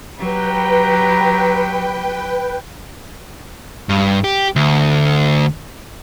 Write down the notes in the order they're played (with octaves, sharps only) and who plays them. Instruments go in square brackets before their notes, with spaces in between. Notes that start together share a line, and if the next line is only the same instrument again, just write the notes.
[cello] F#3 G4 [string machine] B4 G5 [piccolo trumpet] A#5
[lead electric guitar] G2
G4
D2